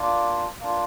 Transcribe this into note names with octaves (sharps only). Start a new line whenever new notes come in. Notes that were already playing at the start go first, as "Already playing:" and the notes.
Already playing: A#3 D4 F4 D5
A#3 D4 F4